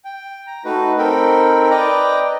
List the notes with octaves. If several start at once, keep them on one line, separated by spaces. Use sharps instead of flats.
G5
A#5
A3 D#4 F#4 B4
C4 D#4 A4 A#4 G5 B5
B4 D5 D#5 G5 A#5